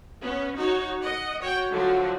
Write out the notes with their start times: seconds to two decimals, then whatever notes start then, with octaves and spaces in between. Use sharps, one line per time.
0.21 B3 C#4
0.56 D#4 F#4 C#5
1.02 D#5 F#5
1.41 F#4 C#5 G5
1.71 D3 F3 F#3 F#4